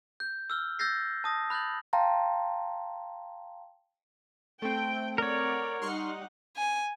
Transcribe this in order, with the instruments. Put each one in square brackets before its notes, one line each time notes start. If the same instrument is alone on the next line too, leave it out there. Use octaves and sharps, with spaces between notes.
[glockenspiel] G6
E6 F6 G7
E6 G6 A6 A#6 C7
A5 D#6 A#6
B5 F#6 G6 A6 F#7
[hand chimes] F5 G5 A5 A#5 C6
[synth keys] A3 C4 [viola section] G5
[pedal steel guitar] A#4 C#5 [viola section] D5 F#5
[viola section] G3 D#4 F#5 [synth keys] C6 C#6 F6
[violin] G#5